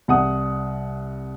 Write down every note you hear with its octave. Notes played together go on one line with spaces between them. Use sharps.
C2 F#5 D#6